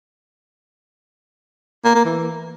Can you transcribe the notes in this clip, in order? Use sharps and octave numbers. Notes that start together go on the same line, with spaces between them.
A#3
A#3
E3